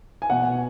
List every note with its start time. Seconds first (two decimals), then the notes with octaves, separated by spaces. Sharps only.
0.22 G#5
0.30 B2 F#5